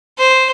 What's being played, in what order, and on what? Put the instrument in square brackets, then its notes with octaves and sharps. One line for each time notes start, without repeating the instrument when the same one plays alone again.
[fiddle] C5